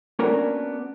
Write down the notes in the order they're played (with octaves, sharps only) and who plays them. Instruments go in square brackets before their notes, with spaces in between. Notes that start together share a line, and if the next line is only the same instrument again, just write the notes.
[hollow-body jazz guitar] A#3 B3 C#4 D4 F#4 A#4